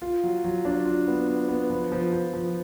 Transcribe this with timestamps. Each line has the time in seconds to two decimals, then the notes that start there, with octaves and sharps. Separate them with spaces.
0.02 F4
0.23 F#3
0.44 F#3
0.65 D4
0.85 F4
1.07 B3
1.28 B3
1.48 B3
1.70 F3
1.92 F3
2.13 F3
2.33 F3